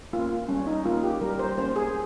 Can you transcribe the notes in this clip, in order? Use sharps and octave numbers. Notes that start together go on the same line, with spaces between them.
A#3 C#4 F4
G3 C#4
D#4
A#3 C#4 F4
G4
G3 A#4
C5
A#3 C#4 C5
G#4